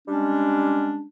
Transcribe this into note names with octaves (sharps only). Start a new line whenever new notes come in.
G3 G#3 C#4 D4